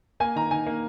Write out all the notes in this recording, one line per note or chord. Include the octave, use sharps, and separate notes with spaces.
A#3 G#5
D#3 A#5
D#3 G#5
A#3